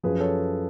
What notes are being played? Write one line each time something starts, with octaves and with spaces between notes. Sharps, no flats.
F#2 F3 G#4 B4
A4 C#5